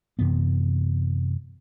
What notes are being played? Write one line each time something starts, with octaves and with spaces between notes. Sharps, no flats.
F#2 C3 E3 B3